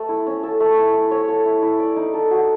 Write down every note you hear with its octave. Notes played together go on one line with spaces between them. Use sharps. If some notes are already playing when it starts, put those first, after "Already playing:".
Already playing: A3 A4
E4
C#4
A4
A3
E4
E4
C#5
A4
E4
E4
D5
D#4
A4
F#4